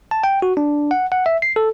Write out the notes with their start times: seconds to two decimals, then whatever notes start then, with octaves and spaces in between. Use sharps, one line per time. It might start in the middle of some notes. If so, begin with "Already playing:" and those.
0.11 A5
0.24 G5
0.42 F#4
0.57 D4
0.91 F#5
1.12 F#5
1.26 E5
1.42 C7
1.56 A4